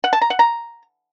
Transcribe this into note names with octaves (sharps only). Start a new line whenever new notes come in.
F#5
A5
A#5
F#5
A#5